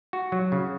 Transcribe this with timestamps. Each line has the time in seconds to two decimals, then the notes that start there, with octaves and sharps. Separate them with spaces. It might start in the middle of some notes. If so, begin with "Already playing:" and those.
0.13 F#4
0.32 F#3
0.52 C#3